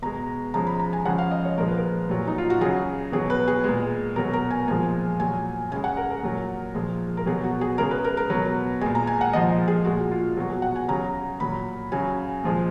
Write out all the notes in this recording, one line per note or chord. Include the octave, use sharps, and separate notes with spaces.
B2 G#3 A#5
C#3 F3 G#3 A#5
B5
A#5
G#5
C#3 F3 G#3 F#5
F5
D#5
C#5
A#2 F3 G#3 A#4
B4
A#4
A#2 F#3
D#4
F4
F#4
C#3 F#3 G#4
B2 F#3 G#4
B4
G#4
A#2 G#3
B2 F#3 A#4
A#4
G#5
A#2 F3 G#3 G#5
A#2 F#3 G#5
C#3 G#3 G#5
F#5
A#4
A#4
A#2 F#3
A#2 F3 G#3
A#4
B2 F#3 G#4
F#4
G#4
C#3 G#3 A#4
B4
A#4
A#4
B2 F#3 B4
A#2 G#3 G#5
A#5
G#5
F#5
A#2 F3 G#3 D#5
G#4
A#2 G#3 F#4
F4
B2 F#3 F#4
G#4
F#5
G#5
C#3 F#3 A#5
A#2 F#3 B5
C#3 F#3 G#5
A#2 F3 G#3